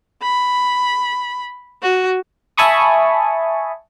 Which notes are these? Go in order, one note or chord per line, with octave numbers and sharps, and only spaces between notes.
B5
F#4
E5 G#5 A5 B5 C#6 D#6